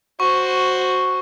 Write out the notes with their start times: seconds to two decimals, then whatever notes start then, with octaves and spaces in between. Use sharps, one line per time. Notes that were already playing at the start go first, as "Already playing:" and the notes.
0.20 F#4 C5 C#6